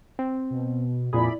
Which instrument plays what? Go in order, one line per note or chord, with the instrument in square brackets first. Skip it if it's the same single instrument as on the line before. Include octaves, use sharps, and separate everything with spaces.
[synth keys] C4
[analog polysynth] B2
[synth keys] F2 A#2 G#4 [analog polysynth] E4 D5 B5